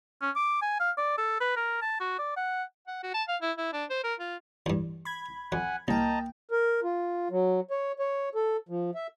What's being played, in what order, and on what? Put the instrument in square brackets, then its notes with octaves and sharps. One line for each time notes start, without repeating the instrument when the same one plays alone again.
[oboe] C#4
D6
G#5
F5
D5
A4
B4
A#4
A5
F#4
D5
F#5
[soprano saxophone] F#5
F#4
A5
F5
E4
E4
D4
C5
A#4
F4
[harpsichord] E2 G2
[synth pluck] B5 G#6
[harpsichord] F2 [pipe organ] F#5 G#5
[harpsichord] C2 [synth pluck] A#3 G5 [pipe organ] D#5 A5 A#5
[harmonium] A#4
F4
F#3
C#5
C#5
A4
F3
E5